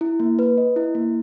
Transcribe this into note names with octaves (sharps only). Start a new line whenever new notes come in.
E4
A#3
B4
D#5
E4
A#3